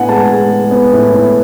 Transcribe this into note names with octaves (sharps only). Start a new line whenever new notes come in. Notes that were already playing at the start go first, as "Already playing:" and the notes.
Already playing: A2 B3 D4 F#5 G#5
G#3 A5
G#3
G#3
B3
A2
A2